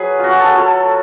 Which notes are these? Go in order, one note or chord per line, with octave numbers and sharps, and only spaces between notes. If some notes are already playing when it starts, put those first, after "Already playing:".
Already playing: F#3 G#4 B4
F4
F#4
G#4
A4
B4
F#3 A4 C#5